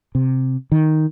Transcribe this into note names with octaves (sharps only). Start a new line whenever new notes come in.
C3
D#3